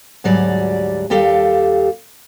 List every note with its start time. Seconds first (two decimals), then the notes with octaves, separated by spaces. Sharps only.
0.24 D2 G#2 F#3 G3 D5 G#5
1.10 D#2 G3 G4 A4 F5